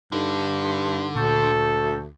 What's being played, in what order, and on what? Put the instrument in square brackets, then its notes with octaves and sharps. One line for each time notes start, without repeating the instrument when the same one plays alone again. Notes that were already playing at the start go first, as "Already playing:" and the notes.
[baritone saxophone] G2 [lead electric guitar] D3 [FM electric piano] D#4 A4
[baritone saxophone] D2 [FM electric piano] A#2 C#6 G6 [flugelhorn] A4